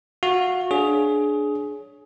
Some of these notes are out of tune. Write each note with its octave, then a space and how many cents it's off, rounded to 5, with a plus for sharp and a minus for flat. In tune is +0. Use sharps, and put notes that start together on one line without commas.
F#4 -20 F5 -25
D4 +5 G#4 +15 C#5 +0